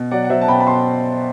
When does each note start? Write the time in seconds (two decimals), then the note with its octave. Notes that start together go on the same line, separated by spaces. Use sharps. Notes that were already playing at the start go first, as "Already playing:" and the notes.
Already playing: B2
0.11 F#3 D5 F#5
0.24 F#5
0.30 F#3 C5 E5
0.41 A5
0.48 B2 G5 B5
0.60 B5
0.67 B2 A5 C6